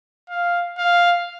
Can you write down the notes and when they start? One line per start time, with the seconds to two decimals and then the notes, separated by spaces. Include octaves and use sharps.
0.30 F5
0.78 F5